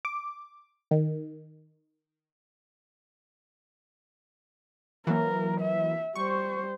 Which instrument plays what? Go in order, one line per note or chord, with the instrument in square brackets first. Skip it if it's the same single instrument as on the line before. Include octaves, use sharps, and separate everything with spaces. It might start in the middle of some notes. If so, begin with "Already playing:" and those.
[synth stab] D6
D#3
[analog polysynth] E3 F#3 A#3 [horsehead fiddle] A#4
[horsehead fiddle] E5
[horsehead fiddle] G3 C5 [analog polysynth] C#6